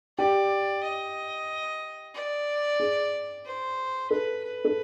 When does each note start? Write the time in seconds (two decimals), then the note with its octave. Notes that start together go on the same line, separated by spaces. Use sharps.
0.18 G4 D5
0.83 D#5
2.15 D5
2.80 G#4
3.45 C5
4.10 A4 B4
4.44 B4
4.65 A4